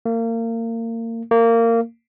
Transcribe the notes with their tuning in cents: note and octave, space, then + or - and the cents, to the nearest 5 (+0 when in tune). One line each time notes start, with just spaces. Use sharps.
A#3 -30
A#3 -20